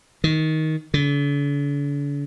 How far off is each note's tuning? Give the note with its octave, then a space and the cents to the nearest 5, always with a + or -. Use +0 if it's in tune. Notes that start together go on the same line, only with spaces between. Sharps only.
D#3 +15
D3 -45